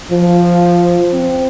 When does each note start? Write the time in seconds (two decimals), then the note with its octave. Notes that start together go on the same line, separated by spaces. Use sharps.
0.11 F3
1.12 C4